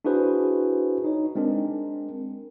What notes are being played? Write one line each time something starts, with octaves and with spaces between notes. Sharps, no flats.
D4 E4 F#4 G#4 B4 C5
D#4 C#5
G#3 C4 D4 A#4